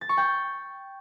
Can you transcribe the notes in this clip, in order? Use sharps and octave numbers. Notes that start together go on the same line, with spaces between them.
A6
C#6
G5